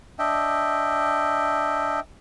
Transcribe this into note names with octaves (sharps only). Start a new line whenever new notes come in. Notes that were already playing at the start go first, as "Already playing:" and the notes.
D4 D#5 E5 G5